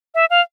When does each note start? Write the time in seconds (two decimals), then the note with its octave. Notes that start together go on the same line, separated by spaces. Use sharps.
0.15 E5
0.30 F5